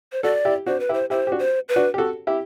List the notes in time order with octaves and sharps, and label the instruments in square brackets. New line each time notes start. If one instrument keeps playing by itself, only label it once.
[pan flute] C5
[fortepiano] F#4 A4 [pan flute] D5
[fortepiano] E4 G4
[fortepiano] D4 F#4 [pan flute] C5
[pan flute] B4
[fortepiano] E4 G4
[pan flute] C5
[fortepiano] E4 G4 [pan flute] C5
[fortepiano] G4
D4 F#4
[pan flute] C5
B4
[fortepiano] D4 F#4
G4
F#4 A4
E4 G4